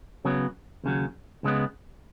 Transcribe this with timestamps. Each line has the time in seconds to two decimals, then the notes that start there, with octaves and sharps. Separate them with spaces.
0.25 C#3 F#3 B3
0.84 D#2 C#3 F#3
1.43 C#2 C#3 G#3 B3